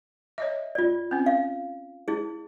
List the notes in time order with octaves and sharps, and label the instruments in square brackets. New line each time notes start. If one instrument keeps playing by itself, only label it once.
[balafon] C#5 D#5 E5
[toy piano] F4 D5
[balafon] C4 C#4
[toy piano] F5
E4 G#4